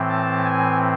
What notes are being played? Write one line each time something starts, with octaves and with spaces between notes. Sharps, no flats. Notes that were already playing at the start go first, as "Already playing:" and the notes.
Already playing: A2 E3 C4
A5
G#5